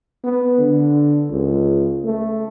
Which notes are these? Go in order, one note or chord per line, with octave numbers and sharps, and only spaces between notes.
B3
D3
C#2
A3